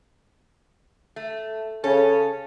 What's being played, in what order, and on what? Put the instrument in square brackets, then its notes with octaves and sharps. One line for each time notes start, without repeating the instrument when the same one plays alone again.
[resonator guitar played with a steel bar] A3
[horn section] C#3 C#4 [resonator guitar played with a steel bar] A4